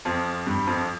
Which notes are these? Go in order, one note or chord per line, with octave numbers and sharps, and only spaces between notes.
F2 F3
G2 G3
F2 F3